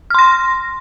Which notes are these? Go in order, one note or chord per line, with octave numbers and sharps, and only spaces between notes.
C6 F6 A#6